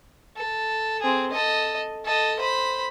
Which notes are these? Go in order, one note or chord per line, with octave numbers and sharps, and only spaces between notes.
A4
C4 G#4
A4 D#5
A4 D#5
C5 B5